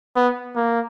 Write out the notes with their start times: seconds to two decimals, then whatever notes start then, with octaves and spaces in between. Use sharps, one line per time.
0.16 B3
0.56 A#3